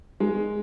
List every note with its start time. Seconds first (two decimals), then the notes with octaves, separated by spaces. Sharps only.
0.20 G#3